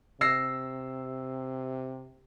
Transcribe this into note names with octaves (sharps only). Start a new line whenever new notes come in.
C3 E6 A#6 C7